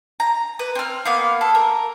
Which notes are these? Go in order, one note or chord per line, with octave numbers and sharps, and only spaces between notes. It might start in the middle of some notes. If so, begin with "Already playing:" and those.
A#5
B4
C4 F6
A#3 B3 F5
A4
A#4